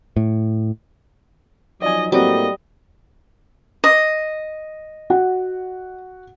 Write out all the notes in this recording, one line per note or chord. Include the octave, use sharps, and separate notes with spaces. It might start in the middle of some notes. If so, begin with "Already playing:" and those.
A2
F3 F#3 D#4 D5 D#5 G#5
A2 F#3 G3 A3 A#3 C4 F#4 D#5
D#5
F#4 F#5